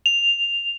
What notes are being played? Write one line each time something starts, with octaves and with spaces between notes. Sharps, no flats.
F7